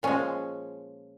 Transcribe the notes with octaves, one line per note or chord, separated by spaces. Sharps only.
A#2 F3 G#3 C#4